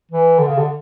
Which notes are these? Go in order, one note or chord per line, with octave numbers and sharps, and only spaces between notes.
E3
D3
C#3
D3